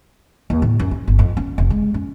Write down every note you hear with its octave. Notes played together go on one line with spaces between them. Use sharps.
D#2
A2
F#2
C#4
G1
F2
C#4
F1
G#3
C#4